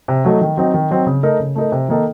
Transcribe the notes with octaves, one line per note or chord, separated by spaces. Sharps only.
C3
F#3 A3 D#4
D#3
F#3 C4 D#4
D#3
F#3 C4 D#4
C#3
A3 D#4 A#4
C#3
A3 D#4 A#4
C3
D#3 A#3 D#4 A4